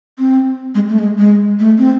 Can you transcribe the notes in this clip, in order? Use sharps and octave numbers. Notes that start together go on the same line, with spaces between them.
C4
G#3
A3
G#3
G#3
A3
C4